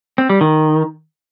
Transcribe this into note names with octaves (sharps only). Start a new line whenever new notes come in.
C4
G3
D#3